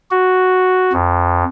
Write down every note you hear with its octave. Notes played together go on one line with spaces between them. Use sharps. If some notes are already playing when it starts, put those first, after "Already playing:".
F#4
F2